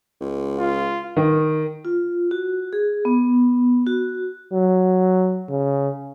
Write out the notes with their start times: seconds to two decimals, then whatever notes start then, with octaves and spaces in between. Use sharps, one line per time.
0.21 C#2
0.58 F4
1.17 D#3
1.85 F4
2.31 F#4
2.73 G#4
3.05 B3
3.87 F#4
4.53 F#3
5.49 C#3